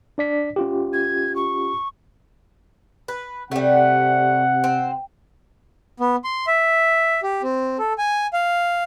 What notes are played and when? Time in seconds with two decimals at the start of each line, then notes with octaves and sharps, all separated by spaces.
0.18 D4 D5 B6
0.56 C#4 F4 G4
0.93 G#6
1.35 C#6
3.08 B4
3.51 C3 G3 A3 F#5
4.64 C4
6.00 B3
6.24 C6
6.47 E5
7.23 G4
7.43 C4
7.79 A4
7.98 G#5
8.33 F5